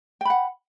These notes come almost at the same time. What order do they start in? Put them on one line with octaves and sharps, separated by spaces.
G5 B5 F#5